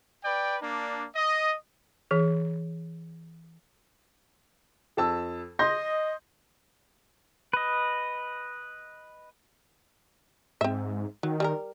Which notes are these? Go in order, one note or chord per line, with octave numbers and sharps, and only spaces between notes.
B4 D5 G5
A#3 D4
D#5
E3 G#4
F2 A5 E6
D#5 C6 G6 A#6
B4 D#5
G#2 C4 E5
D#3 F#3
G3 G#4 A#4